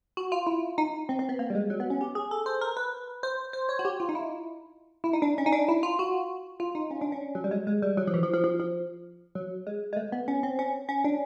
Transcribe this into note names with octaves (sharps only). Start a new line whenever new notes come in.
F#4
F4
E4
D#4
C4
C4
B3
A#3
G3
G#3
F#3
B3
C#4
G4
G#4
A4
C5
A#4
B4
C5
C5
C#5
F#4
G4
F4
D#4
E4
E4
D#4
D4
C#4
D#4
D4
E4
F4
F#4
F4
D#4
C#4
D4
C#4
F#3
G3
G#3
G#3
G3
F#3
F3
E3
F3
F3
F3
F3
F#3
G#3
G#3
A3
B3
C#4
C4
C#4
C#4
D4